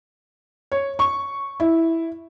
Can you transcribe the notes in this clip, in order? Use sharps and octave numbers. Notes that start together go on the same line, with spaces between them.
C#5
C#6
E4